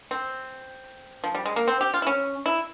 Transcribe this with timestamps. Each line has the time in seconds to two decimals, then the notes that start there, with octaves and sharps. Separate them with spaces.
0.11 C4
1.24 F3
1.35 G3
1.46 G#3
1.56 A#3
1.68 C4
1.81 G4
1.94 F4
2.02 E4
2.07 C#4
2.46 E4